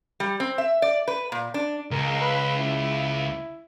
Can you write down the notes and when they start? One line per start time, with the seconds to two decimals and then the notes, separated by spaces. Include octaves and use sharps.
0.20 G3
0.40 C4
0.58 E5
0.82 D5
1.08 B4
1.32 A#2
1.54 D4
1.91 C#2 A#4
2.21 B4
2.58 E4